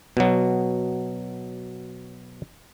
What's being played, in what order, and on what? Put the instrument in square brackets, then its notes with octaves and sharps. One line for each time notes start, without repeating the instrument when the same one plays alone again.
[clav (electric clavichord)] B2 F#3